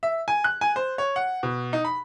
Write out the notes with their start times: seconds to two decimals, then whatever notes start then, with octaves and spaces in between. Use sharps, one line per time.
0.03 E5
0.28 G#5
0.44 F#6
0.61 G#5
0.76 C5
0.98 C#5
1.16 F#5
1.43 B2
1.73 D#4
1.85 B5